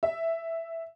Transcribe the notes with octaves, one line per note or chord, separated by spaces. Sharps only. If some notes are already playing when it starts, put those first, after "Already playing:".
E5